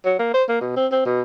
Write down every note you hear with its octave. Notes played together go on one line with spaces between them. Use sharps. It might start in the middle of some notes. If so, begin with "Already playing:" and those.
F#3
A#3
C5
A#3
B2
C4
C4
B2